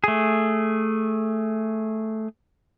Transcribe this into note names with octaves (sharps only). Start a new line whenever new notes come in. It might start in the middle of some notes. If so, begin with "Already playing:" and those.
A3 G#4